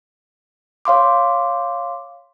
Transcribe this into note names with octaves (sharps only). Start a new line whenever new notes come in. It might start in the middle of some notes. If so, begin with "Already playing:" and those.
C#5 F5 C6 D6